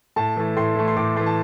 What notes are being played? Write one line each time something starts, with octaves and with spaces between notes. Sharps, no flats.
A2 A5
E3 A3
A2 C6
E3 A3
C6
A2 D6
E3 A3 C6
A5